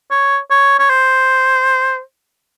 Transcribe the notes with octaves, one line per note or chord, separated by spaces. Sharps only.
C#5
C#5
C#5
C5